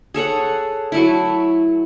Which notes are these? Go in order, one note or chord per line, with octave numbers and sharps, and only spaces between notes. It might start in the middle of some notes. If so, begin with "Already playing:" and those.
G#4 A4 C#5 F#5
F#3 A3 E4